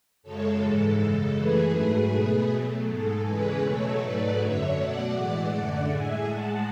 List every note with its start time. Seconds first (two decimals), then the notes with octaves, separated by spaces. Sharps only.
0.23 F#2 C#3 G#3 A4 C#5
0.60 G#2 E3 G#3 A4
0.98 F#2 C#3 G#3
1.36 F#2 E3 A3 G#4 B4
1.73 G#2 F#3 A3
2.11 B2 A3 G#4 B4
2.50 B2 F#3 A3
2.87 G#2 G#3 A4
3.25 E2 C#3 E3 G#3 G#4 B4
3.62 B2 F#3 A3 A4 C#5
4.01 G#2 F#3 A3 B4 D5
4.39 F#2 D3 F#3 C#5 E5
4.76 B2 F#3 A3 D5 F#5
5.14 A2 E3 G#3
5.52 F#2 D3 A3
5.89 A2 G#3 E5 G#5
6.27 A2 G#3 F#5 A5